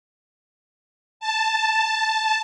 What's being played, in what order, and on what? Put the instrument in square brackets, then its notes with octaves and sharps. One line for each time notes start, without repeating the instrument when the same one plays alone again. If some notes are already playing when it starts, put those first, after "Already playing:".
[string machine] A5